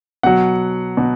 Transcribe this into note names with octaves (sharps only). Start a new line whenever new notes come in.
B2 F#3 F#5
B2